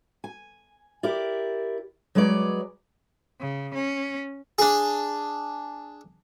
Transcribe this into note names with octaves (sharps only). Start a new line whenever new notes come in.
G#5
E4 G4 A#4 D5
F#3 G#3 B4 C#5 D5
C#3
C#4
D4 G#4